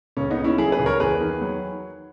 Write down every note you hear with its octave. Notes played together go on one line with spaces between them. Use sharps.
C#2 C#4
B3 D#4
C#3
C#4 E4
F#3 E4 G#4
G#4 B4
C#2
A#4 C#5
E2 G#4 B4
D#3
F#3